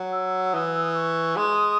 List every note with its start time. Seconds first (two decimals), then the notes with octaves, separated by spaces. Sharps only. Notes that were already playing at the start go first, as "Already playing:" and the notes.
Already playing: F#3
0.12 E6
0.53 E3 D#6
0.68 E6
0.81 D#6
0.95 C#6
1.37 G#3 D#6